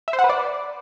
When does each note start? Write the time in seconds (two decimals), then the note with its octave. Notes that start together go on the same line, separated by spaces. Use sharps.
0.08 E5
0.13 C5
0.19 F#5
0.24 B4
0.29 D5